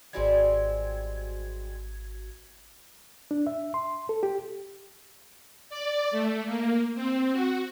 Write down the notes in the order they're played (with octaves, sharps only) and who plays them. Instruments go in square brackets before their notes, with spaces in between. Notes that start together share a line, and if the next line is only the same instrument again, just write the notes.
[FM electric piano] G#1 F#4 G#6 [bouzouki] G3 G#3 C4
[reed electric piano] D4
E5
C6
A4
G4
[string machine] D5
A3
A#3
C4
F#4